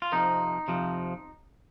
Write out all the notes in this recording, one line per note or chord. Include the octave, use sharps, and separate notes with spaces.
F4
F2 C3 D#3 F3 D#4
F2 C3 F3